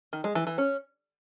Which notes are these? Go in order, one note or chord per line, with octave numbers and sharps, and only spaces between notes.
D#3
G#3
E3
E3
C#4